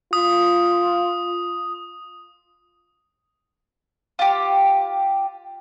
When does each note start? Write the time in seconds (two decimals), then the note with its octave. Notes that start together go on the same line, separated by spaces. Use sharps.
0.13 F4 D#6
4.19 F4 G4